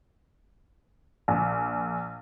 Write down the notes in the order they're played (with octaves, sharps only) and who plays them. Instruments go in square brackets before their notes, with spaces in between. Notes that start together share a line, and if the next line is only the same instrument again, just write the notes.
[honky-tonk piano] A#1